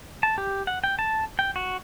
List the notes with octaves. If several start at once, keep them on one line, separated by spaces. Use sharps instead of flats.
A5
G4
F#5
G5
A5
G5
F#4